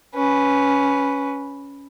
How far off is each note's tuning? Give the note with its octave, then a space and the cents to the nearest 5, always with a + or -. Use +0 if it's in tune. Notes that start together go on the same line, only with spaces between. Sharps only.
C#4 +10 B4 -5